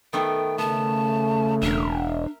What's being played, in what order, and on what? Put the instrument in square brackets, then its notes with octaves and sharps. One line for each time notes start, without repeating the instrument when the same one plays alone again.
[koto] D#3 A3 B3 [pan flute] G5
[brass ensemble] C#3 A3 [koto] B3 [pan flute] A5
[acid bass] E1 [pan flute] D4 [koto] A#4 E5